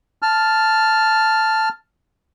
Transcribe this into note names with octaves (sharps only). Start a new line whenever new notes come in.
A5 F6